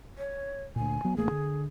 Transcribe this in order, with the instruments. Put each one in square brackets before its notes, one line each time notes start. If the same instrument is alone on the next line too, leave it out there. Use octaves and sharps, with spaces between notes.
[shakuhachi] C#5
[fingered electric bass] D2 A#2 [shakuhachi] G#5
[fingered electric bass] F#3 B3
[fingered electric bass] A1 A3 A#3 [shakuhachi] G#4
[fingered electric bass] D3